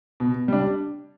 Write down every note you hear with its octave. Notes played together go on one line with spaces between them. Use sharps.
B2
G3 D4